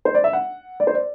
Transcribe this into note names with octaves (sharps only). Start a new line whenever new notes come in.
C5
D5
E5
F#5
D5
C5
D5